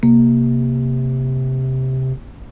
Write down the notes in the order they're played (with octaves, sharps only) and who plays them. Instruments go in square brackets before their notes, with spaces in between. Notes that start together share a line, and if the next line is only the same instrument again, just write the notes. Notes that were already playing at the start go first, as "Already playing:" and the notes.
[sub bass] C3 [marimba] A#3